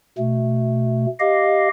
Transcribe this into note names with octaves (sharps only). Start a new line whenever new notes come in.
B2 A3
G4 D#5 F5